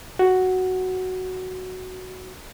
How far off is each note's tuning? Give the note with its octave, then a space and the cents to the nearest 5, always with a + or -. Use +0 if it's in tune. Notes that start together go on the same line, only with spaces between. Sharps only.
F#4 +5